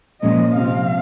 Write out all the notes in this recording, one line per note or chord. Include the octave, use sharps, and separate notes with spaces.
A#2 F3 G#3 C#4 D#5
C3 F3 C4 F5